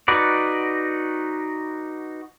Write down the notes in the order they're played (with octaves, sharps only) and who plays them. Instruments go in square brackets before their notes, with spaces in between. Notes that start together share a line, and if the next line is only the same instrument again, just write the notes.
[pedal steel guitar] D#4 F#4 B4 D5